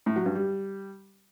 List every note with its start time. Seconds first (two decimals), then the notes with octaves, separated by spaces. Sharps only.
0.06 A2
0.16 F#3
0.26 G2
0.35 G3